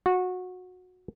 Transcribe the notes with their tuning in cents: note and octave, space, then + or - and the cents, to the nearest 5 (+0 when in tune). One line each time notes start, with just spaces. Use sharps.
F#4 -20